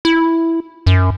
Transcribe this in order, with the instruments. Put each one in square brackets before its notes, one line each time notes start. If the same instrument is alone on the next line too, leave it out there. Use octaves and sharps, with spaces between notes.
[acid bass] E4
F#2